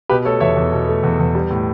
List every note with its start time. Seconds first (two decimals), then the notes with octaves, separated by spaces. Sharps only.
0.09 B2 G4 B4
0.25 A3 A4 C#5
0.40 E2 C#5 E5
0.56 E2
0.72 B2
0.88 A3
1.03 E2
1.19 E2
1.35 G3
1.51 A2